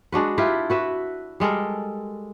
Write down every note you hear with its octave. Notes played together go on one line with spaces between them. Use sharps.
G#3 D4 F#4 B4
E4 F4 G4 B4
F#4 B4 E5
G3 G#3 A4 A#4